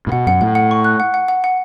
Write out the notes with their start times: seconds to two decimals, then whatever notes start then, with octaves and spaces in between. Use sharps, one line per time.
0.07 A2
0.12 B2 F#5
0.27 F#2 F#5
0.41 A2 F#5
0.55 F#5
0.71 C#6
0.85 F#6
1.00 F#5
1.14 F#5
1.28 F#5
1.44 F#5